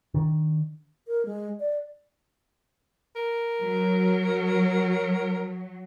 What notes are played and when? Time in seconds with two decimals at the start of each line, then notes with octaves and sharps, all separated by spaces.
0.14 D#3 D4
1.07 A#4
1.26 G#3
1.60 D5
3.16 A#4
3.60 F#3